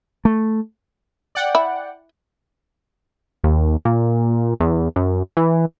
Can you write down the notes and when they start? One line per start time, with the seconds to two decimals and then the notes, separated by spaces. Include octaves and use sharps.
0.25 A3
1.35 D5 F#5 G5
1.55 E4
3.44 D#2
3.85 A#2
4.60 E2
4.96 F#2
5.37 E3